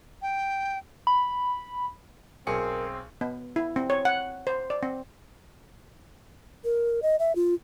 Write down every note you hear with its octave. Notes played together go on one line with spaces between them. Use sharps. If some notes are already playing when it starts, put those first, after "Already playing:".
G5
B5
B1 C4 G#4 A#4 C#7
B3
E4
C4
C#5
F#5
C5
D5
C4
A#4
D#5
E5
F4